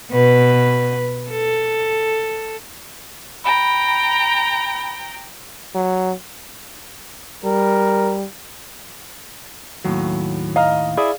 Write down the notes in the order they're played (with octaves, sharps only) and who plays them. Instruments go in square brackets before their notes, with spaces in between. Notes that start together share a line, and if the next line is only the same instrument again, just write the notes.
[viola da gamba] B2 B4
A4
[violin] G5 A#5 [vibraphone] B5
[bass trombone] F#3
[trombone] G3 [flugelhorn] A#4
[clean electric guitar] D#2 A2 [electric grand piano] F#3
[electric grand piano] D#5 A#5 F6 [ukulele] F5
[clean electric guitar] E4 [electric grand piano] G#4 D5 D#6